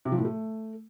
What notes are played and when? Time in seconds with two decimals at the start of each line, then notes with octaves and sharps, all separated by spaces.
0.05 C3
0.12 F3
0.18 A2
0.25 A3